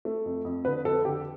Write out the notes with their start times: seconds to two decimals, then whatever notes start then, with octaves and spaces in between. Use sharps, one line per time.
0.05 A3
0.26 F2
0.45 F2
0.65 D3 B4
0.85 F2 A4
1.05 D3 G4